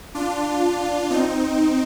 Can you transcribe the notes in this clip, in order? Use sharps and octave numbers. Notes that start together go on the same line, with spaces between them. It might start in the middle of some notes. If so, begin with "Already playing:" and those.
D4 F4
C4 D#4